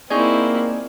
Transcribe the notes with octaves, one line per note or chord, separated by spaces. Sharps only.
A#3 C4 D#4 E4 G#4 C#5 D5